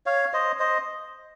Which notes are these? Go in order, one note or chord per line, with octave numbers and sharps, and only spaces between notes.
C#5 F5
C5 D#5
C5 D#5